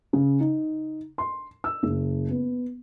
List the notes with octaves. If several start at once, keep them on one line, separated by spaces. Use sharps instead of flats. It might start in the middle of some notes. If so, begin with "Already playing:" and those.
C#3
D#4
C6
E6
F#1
B3